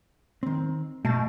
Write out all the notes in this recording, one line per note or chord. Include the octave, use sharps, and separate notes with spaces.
D#3 C4
B2 A3 A5